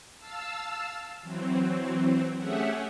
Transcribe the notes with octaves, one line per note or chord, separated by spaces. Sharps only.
F5 A5 E6
E3 F#3 C4
A3 C#4 G4 G#4 E5 F#5